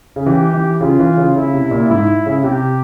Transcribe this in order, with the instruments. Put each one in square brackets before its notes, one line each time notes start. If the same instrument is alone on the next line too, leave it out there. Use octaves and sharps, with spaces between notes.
[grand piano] C#3
[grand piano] E3 [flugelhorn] G4
[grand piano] E3
[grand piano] C#3 [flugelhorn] F4
[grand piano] E3
C#3
[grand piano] C#3 [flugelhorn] E4
[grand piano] C3
A#2
[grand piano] G#2 [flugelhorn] E4
[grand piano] C#3
[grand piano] C3 [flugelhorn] G4